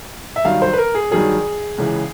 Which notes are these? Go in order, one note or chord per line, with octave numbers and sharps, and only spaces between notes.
E5
G2 D#3 F#3 F5
C5
B4
A#4
G#4
G2 D#3 F#3 G#4
C#2 C#3 E3